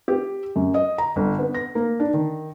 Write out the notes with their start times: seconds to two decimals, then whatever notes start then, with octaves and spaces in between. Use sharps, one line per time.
0.08 G4
0.56 F#2
0.74 D#5
0.98 A#5
1.16 G1
1.39 B3
1.55 A#6
1.75 A#3
2.00 D4
2.14 D#3